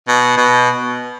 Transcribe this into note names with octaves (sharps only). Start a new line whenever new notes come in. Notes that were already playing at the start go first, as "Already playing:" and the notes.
B2
B2